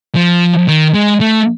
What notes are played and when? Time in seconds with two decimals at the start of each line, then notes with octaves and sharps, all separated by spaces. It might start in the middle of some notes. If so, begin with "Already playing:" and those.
0.15 F3
0.68 D#3
0.94 G#3
1.21 A3